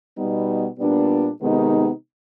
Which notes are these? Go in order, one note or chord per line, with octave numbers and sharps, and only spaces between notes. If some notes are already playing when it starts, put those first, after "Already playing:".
B2 G3 B3 D#4
A#2 G3 B3 D4
C3 D#3 G#3 B3 D#4